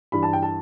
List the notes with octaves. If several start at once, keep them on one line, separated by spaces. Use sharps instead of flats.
G2 E3 B5
A5
G5
A5